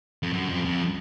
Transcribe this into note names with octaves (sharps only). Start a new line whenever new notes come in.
F2
F#2
F2
F2